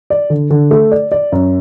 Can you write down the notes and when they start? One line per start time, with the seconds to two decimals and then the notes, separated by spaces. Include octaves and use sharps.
0.10 D5
0.30 D3
0.50 D3
0.71 A3
0.92 D5
1.12 D5
1.32 F#2